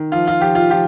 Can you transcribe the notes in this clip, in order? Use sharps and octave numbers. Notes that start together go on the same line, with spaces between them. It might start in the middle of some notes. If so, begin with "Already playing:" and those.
Already playing: D#3
F3 F4
F4
F3 G4
F4
F3 G4